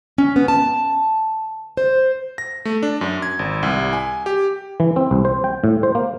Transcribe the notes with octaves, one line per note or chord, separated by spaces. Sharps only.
C#4
B3
A5
C5
A#6
A3
D4
F#2
G#6
G#1
C2
G#5
G4
E3
C4
C2
C5
G5
A2
C5
A#3